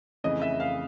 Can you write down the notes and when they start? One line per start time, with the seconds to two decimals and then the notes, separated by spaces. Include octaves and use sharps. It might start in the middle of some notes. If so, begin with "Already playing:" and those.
0.24 F2 C#3 E3 A3 D#5
0.42 E5
0.60 F5